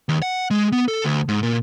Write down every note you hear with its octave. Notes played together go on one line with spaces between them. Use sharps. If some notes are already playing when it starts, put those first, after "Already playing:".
D#2
F#5
G#3
B3
A4
D2
G#2
A#2